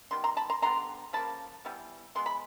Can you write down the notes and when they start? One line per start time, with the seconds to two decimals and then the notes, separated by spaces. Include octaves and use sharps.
0.11 D#3 G3 B3 C6
0.24 A#5 C6
0.37 A5 B5
0.50 A#5 C6
0.62 D3 G3 B3 A#5 C6
1.13 C#3 F3 A#3 A5 B5
1.65 E3 G3 B3
2.15 E3 G#3 B3 C6
2.26 B5